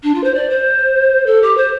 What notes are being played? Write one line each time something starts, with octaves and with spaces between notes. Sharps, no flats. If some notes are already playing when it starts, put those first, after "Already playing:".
D4
F4
C5
D5
C5
A4
G4
C5